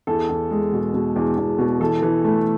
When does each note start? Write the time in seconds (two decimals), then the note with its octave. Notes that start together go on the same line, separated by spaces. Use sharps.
0.07 E2 A4
0.29 E2
0.51 G#3
0.73 B2
0.94 B2
1.16 E2
1.38 E2
1.59 B2
1.80 E3 A4
2.02 E3
2.24 A3